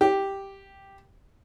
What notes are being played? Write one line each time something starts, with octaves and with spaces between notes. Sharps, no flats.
G4